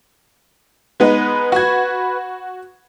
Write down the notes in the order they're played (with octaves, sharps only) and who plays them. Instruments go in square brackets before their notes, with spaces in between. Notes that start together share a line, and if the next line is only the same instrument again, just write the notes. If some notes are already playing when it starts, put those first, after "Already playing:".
[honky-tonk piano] G#3 B3 D#4 [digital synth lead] B4
[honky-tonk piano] F#4 G#6